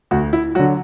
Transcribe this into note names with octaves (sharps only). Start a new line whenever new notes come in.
D2 F#4
E4
D3 F#3 F#4